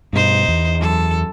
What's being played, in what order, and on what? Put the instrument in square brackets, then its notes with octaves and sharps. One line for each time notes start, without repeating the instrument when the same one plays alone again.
[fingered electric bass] G2 B2 [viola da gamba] D#4 C5
[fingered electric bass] E2
[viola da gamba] F#2 A4